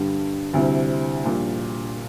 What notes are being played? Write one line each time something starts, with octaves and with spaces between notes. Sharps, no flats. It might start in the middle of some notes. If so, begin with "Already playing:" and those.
Already playing: G2 D3 G3
D2 C3 G3 C4 E4
A#1 A#2 G3